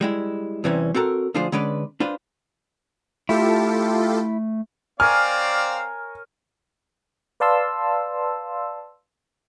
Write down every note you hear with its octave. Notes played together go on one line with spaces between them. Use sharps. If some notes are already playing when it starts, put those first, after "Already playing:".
G3 G#3 E4
E2 C3 E3 G3 C4 C#4
C4 F#4 A4 A#4
D2 F3 D4 F4 G#4 C5
D3 G#3 C#4 D4 B4 D5
D4 F4 B4 C5
A3 E4 F4 G4 A4
C4 A#4 C#5 D5 F5 G#5 F6
B4 D5 F5 A5 C6 E6